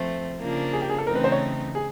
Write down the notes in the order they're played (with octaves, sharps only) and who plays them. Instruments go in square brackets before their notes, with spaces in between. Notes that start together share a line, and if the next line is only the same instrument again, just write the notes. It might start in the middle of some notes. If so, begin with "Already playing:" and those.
Already playing: [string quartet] F3 A3 C4
C#3 F3 A#3 D4
[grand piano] G#4
G4
G#4
A4
[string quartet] C#3 E3 A3 C4 D#4 [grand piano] A#4
[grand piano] B4
C5
C#5
G#4